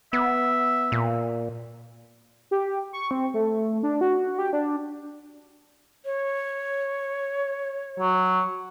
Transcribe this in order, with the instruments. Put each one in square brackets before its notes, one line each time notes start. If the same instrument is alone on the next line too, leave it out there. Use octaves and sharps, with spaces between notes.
[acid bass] B3 [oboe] E5
[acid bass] A#2
[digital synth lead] G4
C#6
C4
A3
D4
F#4
G4
D4
[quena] C#5
[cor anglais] F#3